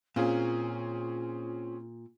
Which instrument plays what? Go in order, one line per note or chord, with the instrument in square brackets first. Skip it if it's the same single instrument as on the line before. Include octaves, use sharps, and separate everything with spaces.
[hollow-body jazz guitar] A#2 [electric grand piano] C4 C#4 G#4 [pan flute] F4